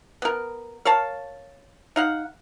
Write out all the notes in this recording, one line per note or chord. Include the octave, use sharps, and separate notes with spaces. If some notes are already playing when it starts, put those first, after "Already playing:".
B3 A#4
A#4 C#5 F5 A5
D#4 F5 F#5